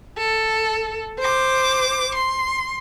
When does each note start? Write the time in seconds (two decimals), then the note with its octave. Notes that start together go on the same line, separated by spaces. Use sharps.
0.18 A4
1.19 C5 D6
2.15 C6